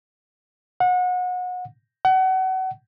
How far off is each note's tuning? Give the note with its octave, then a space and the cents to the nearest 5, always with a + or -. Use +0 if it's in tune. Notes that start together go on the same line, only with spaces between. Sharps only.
F#5 -30
F#5 +30